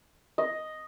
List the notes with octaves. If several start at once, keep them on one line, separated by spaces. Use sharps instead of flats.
D#5